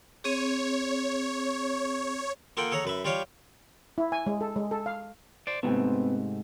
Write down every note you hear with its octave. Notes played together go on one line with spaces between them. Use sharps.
C4 G#4 C#5
A#3 F4 A4 F#5 G5
G#4 A4 C#5 F#5 A#5
F#2 B4 E5
G3 F4 G4 C#5 F5
E4
G#5
G#3
A4
G#3
A4
F5
C5 D5
G#2 C3 A3 B3 C4